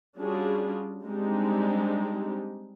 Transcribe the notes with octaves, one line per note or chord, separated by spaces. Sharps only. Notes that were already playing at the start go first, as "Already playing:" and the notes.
G3 C#4 D4 F4 F#4 G#4
G3 G#3 C4 D4 D#4 G4